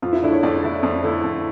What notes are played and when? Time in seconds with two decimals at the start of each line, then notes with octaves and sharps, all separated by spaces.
0.02 F2 F4
0.13 E4
0.23 D3 A3 D4 E4
0.32 C#5
0.43 F2 D5
0.63 D3 A3 E4
0.83 F2
1.03 D3 A3 E4
1.24 F2